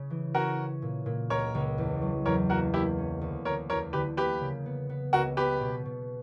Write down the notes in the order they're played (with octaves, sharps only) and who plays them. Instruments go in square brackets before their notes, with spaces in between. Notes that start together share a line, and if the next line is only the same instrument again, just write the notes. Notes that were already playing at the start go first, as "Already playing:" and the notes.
Already playing: [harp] C#3 C#4
E3
[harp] C#4 [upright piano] F#4 A#4
[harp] C#4
A#2
A#2
[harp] C#2 [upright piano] A#4 C#5
[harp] C#2
E2
F#3
[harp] E2 [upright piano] A#4 C#5
[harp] A#3 [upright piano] F#4 A#4
[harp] A#3 [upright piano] E4 G4
[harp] C#4
D2
[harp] D2 [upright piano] A#4 C#5
[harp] E2 [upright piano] A#4 C#5
[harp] D3 [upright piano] G4 B4
[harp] A#3 [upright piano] G4 B4
[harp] C#3
B3
B3
[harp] C#2 [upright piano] F#4 A#4
[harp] B3 [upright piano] G4 B4
[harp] B2
B2